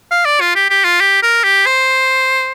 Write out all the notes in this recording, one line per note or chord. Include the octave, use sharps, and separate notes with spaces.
F5
D5
F4
G4
G4
F4
G4
A#4
G4
C5